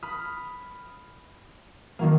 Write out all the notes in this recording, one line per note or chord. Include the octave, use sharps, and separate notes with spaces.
B5 D#6 F6
D#3 F#3 A#3